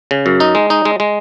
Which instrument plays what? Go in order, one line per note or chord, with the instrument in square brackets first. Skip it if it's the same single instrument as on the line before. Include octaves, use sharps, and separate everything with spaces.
[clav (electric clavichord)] C#3
F#2
D#4
G#3
D#4
G#3
G#3